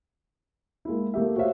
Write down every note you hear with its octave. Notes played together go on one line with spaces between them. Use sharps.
G#3 A#3 E4
A3 A#3 G4 E5
F#4 G4 C5 C#5 E5 F5